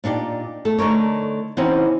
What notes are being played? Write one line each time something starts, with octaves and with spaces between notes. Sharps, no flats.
A#2 D4 D#4 G4
A3 A4
D3 A3 D#4 A#4 C#5
E3 C4 C#4 D#4 F#4 D#5